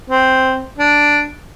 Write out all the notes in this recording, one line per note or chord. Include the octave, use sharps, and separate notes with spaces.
C4
D4